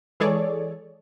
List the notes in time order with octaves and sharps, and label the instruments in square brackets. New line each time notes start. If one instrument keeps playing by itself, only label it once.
[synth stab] E3 G#3 G#4 A4 C#5 D5